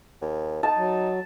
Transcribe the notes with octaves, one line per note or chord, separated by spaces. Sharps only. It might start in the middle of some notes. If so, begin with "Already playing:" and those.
D#2
D#4 A5
F#3